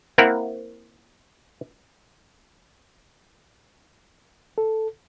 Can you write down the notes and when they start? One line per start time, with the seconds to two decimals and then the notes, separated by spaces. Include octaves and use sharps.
0.18 A#3 C4 E4 A#4 F#5
4.58 A4